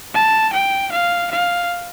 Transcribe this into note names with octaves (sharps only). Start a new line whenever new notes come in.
A5
G5
F5
F5